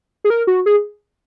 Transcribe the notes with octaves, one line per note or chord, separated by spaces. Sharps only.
G#4
A#4
F#4
G#4